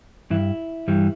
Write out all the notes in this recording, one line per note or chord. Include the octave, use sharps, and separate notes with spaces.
G2 E3 E4
G2 E3 G3